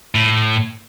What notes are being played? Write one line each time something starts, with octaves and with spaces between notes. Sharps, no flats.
A2